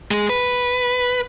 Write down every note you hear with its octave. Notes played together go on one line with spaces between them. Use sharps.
G#3 G#4
B4